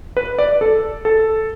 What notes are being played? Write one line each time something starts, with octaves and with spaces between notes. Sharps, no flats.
B4
D5
A4
A4